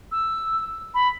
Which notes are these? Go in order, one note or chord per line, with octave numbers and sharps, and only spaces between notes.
E6
B5